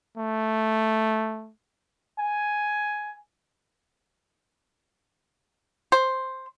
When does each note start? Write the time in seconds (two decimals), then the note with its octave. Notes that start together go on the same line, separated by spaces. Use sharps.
0.18 A3
2.19 G#5
5.92 C5